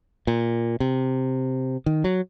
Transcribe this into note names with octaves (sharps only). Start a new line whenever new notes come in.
A#2
C3
D#3
F#3